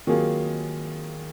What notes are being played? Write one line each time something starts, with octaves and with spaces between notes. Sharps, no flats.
D#3 F#3 A#3 F4 G#4